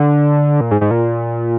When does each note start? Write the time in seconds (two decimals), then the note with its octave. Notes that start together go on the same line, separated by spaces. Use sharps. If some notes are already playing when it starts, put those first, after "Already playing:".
Already playing: D3
0.61 A#2
0.71 G#2
0.81 G#2
0.91 A#2